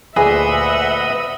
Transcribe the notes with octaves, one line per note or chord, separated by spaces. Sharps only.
D2 A#2 G#4 B4 D#5 E5 F#5